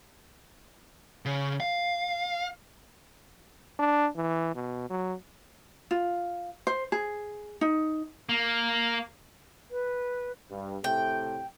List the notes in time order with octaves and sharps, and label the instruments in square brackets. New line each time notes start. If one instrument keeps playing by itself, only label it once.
[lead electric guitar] C#3
F5
[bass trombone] D4
E3
B2
F#3
[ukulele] F4
C5
G#4
D#4
[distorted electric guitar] A#3
[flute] B4
[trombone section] G2
[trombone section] A2 C3 A3 [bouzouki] G5